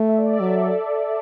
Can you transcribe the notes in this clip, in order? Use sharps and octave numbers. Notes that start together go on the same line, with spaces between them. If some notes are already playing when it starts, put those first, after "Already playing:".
Already playing: A3
E5
D5
E5
F#3 A4